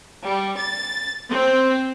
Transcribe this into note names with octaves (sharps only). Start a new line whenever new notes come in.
G3
A6
C4